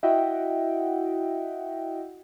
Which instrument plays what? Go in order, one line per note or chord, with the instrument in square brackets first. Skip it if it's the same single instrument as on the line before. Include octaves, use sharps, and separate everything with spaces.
[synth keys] E4 F#4 D#5 E5 F#5 G5